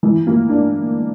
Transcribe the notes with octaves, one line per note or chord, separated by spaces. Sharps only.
E3
A#3
D4